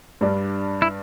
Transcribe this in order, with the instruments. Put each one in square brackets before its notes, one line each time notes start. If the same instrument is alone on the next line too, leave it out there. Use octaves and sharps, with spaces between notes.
[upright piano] G2 G3 D4
[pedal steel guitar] E4